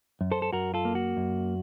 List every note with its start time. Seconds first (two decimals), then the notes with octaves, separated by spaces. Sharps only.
0.21 F#2
0.32 A4 C5
0.42 A4
0.53 F#2 F#4 A#4
0.74 F4 A4
0.85 A#3
0.95 F#4
1.17 F#2